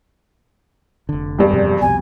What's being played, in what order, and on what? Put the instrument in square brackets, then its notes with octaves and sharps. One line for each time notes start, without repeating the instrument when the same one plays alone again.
[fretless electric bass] F1 D3
[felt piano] E1 G2 [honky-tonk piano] G3 G4 D5
[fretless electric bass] F2 C3
[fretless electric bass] C2 F2 B2 [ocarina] G#5